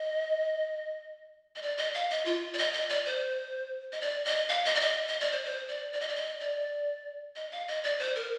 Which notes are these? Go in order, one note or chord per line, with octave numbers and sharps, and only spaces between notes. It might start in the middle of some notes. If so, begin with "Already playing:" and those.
Already playing: D#5
D#5
D5
D#5
F5
D#5
F4
D5
D#5
D#5
D5
C5
D#5
D5
D#5
F5
D#5
D5
D#5
D#5
D5
C5
C5
D5
D5
D#5
D5
D#5
D5
D#5
F5
D#5
D5
C5
A#4